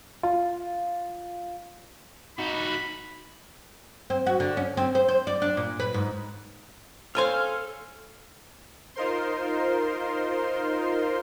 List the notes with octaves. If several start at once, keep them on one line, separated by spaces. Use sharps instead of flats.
F4
D#4 F#4 B5
C4
F#4
D3
C#4
C4
C5
C5
D5
D4
A#2
B4
G#2
C4 C#4 A4 C5 F5 G#5 C6 F6
D#4 F4 A#4 C5 C6